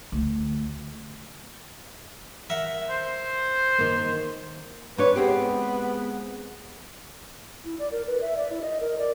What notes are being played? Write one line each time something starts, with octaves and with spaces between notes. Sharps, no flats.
D2
A#4 E5 F#5
C5
D#3 A#3
G#2 D4 B4 C#5
G#3 B3 C4 G4
E4
D5
A#4
B4
E5
D5
E4
D#5
A#4
D5